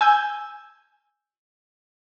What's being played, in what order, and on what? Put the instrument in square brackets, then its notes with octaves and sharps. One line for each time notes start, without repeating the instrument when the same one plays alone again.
[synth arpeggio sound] G#5 E6 G6